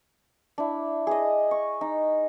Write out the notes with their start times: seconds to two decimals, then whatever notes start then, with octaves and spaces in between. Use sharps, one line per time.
0.58 D4 E4
1.07 G#4 D#5
1.51 C#6
1.81 D#4